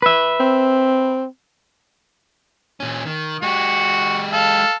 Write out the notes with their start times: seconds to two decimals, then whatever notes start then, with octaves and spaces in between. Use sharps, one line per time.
0.02 B4 E5
0.40 C4
2.80 A#2 C#4
3.06 D#3
3.42 G#3 F#4 G4
4.33 A4 F5